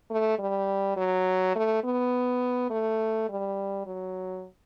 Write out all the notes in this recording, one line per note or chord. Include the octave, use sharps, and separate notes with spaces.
A3
G3
F#3
A3
B3
A3
G3
F#3